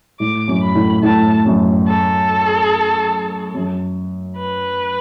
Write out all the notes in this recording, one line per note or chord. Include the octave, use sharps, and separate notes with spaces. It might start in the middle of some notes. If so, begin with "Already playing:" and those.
A2 D6
F#2
B5
A2
A2 A5
F#2
A4
F#2
B4